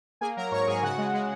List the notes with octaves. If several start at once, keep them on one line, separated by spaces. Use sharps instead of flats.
A#3 G#4 G#5
F#3 A#4 A#5
G#2 C#5 C#6
G#2 G#4 G#5
C#3 F#4 F#5
G#3
G#3